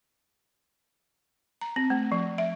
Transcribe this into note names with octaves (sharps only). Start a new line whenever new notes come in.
A#5
C4
A3
F3
E5